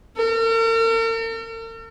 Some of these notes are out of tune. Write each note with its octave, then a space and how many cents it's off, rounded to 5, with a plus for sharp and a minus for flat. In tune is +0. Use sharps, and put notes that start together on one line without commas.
A#4 -45